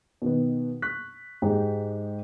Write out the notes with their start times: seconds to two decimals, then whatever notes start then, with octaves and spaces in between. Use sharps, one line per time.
0.22 B2 D#3 B3
0.82 C#6 F#6 B6
1.42 G#2 G#3 D#4 G4